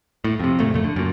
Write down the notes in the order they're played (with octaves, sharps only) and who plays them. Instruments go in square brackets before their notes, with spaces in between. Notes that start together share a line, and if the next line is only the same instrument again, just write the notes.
[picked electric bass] A2
F2 C3
F#1 A#2 A3
F#1 F2 A3
D3
F#2 A#2